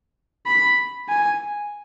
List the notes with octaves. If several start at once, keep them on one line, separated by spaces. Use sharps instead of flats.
B5
G#5